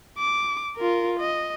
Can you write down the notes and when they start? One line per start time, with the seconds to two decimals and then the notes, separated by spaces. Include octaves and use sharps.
0.18 D6
0.77 F4 A#4
1.20 D#5